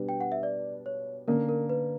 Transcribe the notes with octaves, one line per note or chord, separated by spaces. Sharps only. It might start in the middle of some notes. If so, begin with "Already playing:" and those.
Already playing: B2 G3 B3 D4
G5
F#5
E5
D5
C#5
D3 A#3 C#4 A#4
A#4
B4